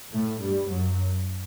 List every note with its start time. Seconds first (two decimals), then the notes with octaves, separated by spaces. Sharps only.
0.12 A2 A3
0.41 G2 G3
0.69 F#2 F#3